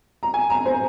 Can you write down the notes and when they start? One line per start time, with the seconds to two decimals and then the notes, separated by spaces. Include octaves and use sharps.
0.23 A#5
0.34 G#5
0.50 A#5
0.66 C5